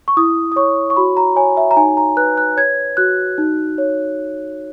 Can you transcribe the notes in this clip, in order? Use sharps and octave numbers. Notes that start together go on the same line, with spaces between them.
C#6
E4 D#6
D#6
C#5 C#6
C#6
F#4 B5
A#5
C#5 G#5
E5
A#5
D#4 G#5
A#5
B4 F#6
F#6
C#5 G#6
F#4 F#6
D#4
C#5